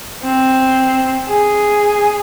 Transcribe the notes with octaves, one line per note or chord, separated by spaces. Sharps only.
C4
G#4